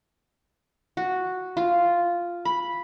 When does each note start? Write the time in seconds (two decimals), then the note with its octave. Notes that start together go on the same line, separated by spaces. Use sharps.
0.97 F#4
1.57 F4
2.45 B5